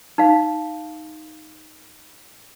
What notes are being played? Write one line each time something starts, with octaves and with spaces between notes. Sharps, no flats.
D#4 F5